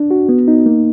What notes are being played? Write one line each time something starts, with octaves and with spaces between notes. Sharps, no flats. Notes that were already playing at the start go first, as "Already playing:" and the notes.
Already playing: D4
F#4
B3
D#4
A#3